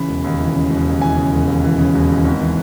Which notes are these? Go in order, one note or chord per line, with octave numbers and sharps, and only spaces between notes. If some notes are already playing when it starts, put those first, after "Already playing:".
Already playing: C#3 E3 B5
E1
D#2
E3
C#3
E1
D#2
E3 G#5
C#3
E1
D#2
E3
C#3
E1
D#2
G#1
E3